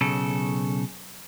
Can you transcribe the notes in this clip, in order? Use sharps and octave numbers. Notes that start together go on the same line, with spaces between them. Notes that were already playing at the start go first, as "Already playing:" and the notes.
B1 C#3 A4